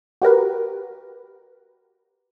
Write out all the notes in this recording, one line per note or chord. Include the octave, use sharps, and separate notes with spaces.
F#4 G4 A#4 B4